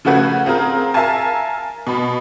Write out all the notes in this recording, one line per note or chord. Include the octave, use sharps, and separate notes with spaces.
C#3 F3 A3 F#4 B4 G#6
C4 F4 G#4 A#4
A#4 E5 F5 G#5 A5
B2 B5